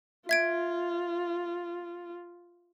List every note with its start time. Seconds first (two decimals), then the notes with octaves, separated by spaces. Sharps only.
0.29 F4 E5 G#6 D7